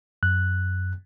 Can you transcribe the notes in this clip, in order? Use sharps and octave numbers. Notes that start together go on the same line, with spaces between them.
F#2 F#6